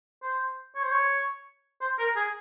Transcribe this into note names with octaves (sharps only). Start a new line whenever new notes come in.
C5
C#5
C5
C#5
C5
A#4
G#4